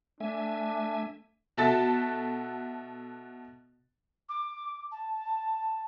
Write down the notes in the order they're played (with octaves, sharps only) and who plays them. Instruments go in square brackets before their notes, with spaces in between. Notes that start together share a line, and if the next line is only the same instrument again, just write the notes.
[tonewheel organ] A3 E5 G#5 [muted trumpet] D4
[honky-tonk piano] B2 F#4 A4 E5 A5 A6
[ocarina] D6
A5